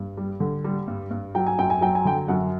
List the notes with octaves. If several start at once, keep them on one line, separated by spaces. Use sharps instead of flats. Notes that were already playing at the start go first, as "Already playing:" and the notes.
Already playing: G2
G3
D3
G3
G2
G2
F#3 G5
G#5
F#2 G5
G#5
F#3 G5
G#5
D3 G5
F#2 F#5